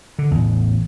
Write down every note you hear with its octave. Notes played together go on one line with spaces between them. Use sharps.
D3
A1 E2